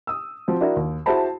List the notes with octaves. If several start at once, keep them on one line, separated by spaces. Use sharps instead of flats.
D#6 E6
F3 C4 F#4
D4 E4 F#4 A#4
D#2
E4 F#4 G#4 C5 A5 B5